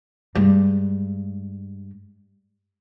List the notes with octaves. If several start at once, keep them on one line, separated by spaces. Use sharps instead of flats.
G2 G#3